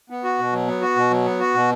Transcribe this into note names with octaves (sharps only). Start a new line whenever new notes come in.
B3
F#4
B2
F#3
B3
F#4
B2
F#3
B3
F#4
B2